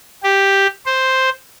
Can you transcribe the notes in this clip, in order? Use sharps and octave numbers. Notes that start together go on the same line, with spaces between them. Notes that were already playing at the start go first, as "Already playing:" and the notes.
G4
C5